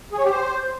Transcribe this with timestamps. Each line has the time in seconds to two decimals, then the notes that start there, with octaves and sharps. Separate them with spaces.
0.12 G#4
0.18 C#5
0.24 G4
0.30 C5